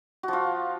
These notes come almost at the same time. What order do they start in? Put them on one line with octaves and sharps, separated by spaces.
F#4 F3 F4